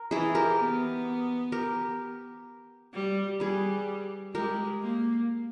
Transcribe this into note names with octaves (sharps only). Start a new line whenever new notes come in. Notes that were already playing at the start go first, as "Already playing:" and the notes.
Already playing: A#4
E3 E4 G#4
G4 A#4
B3
G4 A#4
G3
G3 G#4 B4
G#3 G4 A#4
A#3